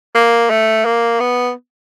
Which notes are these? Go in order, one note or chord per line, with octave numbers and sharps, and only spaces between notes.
A#3
A3
A#3
B3